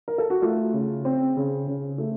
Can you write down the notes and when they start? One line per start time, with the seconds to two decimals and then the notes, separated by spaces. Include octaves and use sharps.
0.08 A#4
0.18 A4
0.30 F#4
0.42 A3 F4
0.73 C#3
1.05 C4
1.36 C#3
1.67 C#3
1.98 A3